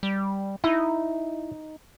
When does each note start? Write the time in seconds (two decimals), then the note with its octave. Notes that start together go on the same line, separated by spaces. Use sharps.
0.03 G3
0.64 D#4 E4